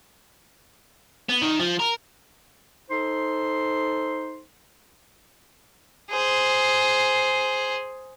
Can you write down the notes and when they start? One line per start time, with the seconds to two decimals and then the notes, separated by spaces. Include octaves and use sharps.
1.29 B3
1.42 D#3
1.60 F3
1.80 A#4
2.90 D#4 A4 C5 C6
6.10 G#4 C5